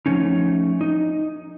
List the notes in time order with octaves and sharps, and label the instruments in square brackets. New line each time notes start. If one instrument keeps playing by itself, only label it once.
[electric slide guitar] F3 A3 C#4 D#4
D#4